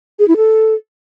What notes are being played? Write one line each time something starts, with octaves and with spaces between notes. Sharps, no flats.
G#4
E4
A4